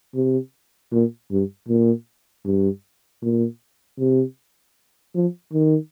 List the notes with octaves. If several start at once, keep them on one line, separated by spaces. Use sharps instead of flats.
C3
A#2
G2
A#2
G2
A#2
C3
F3
D#3